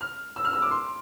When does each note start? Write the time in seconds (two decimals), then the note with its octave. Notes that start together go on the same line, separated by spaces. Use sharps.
0.01 F6
0.36 E6
0.45 F6
0.53 E6
0.62 D6
0.71 C6